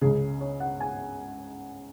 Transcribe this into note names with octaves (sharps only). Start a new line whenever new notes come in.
C#2 C#3 G#4
C#5
F#5
G#5